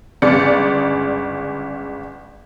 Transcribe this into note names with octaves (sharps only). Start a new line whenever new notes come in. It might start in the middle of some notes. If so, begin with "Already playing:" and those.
G1 C#3 G#3 D5 C#7